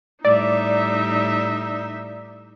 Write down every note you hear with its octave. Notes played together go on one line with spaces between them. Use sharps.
A2 G3 D#4 D5 E5